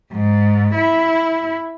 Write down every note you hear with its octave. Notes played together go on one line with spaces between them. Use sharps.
G#2
E4